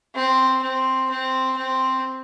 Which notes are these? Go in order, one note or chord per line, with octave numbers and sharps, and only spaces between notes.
C4
C4
C4
C4